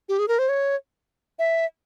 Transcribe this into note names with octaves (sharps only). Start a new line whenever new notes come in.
G4
G#4
A#4
C5
C#5
E5